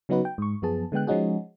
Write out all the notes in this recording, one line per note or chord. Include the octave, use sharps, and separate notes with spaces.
C#3 F#3 B3 D#4 F#4 B4
G5
G#2 C#6
F#2 F3 B3 G#4 A5
D3 G#3 B3 G5 F#6
F3 G#3 C#4 D#4 F#4 G#4